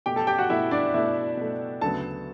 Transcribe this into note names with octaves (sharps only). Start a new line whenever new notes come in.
B2 A3 G4 G5
A4 A5
G4 G5
F#4 F#5
B2 A3 E4 E5
D4 D5
B2 A3 E4 E5
B2 A3
D2 C#3 F#3 B3 A4 A5